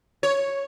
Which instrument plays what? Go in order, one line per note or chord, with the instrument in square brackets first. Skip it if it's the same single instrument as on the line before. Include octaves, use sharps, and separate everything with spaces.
[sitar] C#5